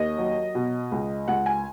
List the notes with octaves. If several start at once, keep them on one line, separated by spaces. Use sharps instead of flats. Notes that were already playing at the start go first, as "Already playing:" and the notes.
Already playing: D#2 D#5
F#3
B2
C#2
C#2 F#5
G#5